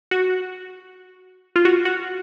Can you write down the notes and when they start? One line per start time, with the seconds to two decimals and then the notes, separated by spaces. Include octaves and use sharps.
0.11 F#4
1.56 F4
1.65 F#4
1.85 F#4